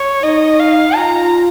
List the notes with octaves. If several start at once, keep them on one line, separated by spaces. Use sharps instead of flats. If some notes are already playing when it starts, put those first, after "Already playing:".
Already playing: C#5
D#4 D#5
F5
F4 A#5